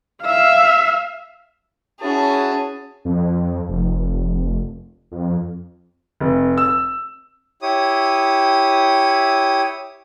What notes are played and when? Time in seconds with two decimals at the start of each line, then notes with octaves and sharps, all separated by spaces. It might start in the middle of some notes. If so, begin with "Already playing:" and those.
0.22 E5 F5
2.01 C#4 E4 F#4 G#4 A5
3.05 F2
3.69 F1
5.12 F2
6.20 F1
6.58 E6
7.62 E4 G4 C#5 D#6